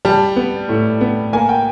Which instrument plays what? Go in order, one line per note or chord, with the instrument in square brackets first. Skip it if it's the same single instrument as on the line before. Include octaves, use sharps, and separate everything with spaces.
[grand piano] G3 A5
B3
A2
B3
A#3 G#5
G5